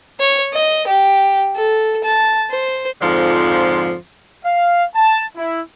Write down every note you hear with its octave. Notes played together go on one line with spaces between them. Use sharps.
C#5
D#5
G4
A4
A5
C5
F2 G#2 D3 F3
F5
A5
E4